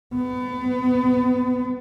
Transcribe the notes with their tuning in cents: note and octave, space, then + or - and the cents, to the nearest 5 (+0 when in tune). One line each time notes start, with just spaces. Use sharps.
B3 +30